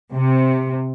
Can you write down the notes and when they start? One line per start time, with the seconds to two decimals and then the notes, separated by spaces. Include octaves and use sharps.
0.12 C3